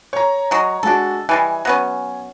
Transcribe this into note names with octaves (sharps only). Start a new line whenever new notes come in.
C#5 A#5
F#3 G#3
G#3 D4 F#4 A4
E3 G3 G#3 G#5
F#3 B3 C#4